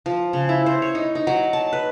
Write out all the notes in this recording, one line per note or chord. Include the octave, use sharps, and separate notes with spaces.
F3
C#3
E4
C5
C#5
D#4
D#4
F#3
A5
B4